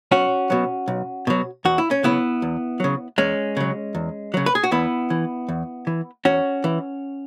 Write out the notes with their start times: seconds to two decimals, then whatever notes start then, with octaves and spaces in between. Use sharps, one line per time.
0.11 B1 C#4 F#4
0.50 B2 F#3
0.88 B1
1.27 B2 F#3
1.65 E2 F#4
1.78 E4
1.91 C#4
2.03 C#3 F#3 B3 E4
2.42 E2
2.80 C#3 F#3
3.18 E2 G#3 C#4
3.57 C#3 F#3
3.95 E2
4.34 C#3 F#3
4.46 B4
4.55 G#4
4.63 F#4
4.71 E2 B3 E4
5.10 E3
5.49 E2
5.87 E3
6.25 E2 C#4 F#4
6.64 E3